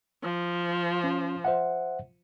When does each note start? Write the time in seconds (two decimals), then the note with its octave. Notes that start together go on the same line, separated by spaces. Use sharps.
0.23 F3
1.04 C#4
1.45 C5 E5 F#5